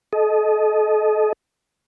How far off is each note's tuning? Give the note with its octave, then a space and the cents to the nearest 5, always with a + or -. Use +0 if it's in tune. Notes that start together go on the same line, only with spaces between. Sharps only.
A4 -35 D#5 +0